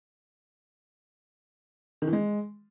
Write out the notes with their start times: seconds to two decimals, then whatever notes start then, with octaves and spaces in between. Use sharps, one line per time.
2.02 D#3
2.07 E3
2.13 G#3